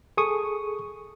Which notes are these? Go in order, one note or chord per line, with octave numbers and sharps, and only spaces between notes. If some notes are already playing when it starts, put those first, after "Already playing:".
G#4 A4 C#6 D#6